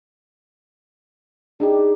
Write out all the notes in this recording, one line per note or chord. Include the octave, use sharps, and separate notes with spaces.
D4 D#4 G4 G#4